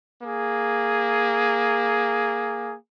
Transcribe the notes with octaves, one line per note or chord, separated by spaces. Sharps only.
A#3 G#4